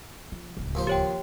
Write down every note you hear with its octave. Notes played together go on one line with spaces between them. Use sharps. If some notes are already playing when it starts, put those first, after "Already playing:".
F3
D1 C#2
D#2 F3 C5
G4 C#5 G5